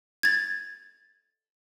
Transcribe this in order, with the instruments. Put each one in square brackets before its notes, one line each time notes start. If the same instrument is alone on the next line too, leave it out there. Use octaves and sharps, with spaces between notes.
[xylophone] G#6 A6